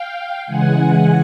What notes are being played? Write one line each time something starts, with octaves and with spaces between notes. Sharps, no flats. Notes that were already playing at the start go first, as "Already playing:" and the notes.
Already playing: F5 G5
C#3 E3 G#3 F#5 G#5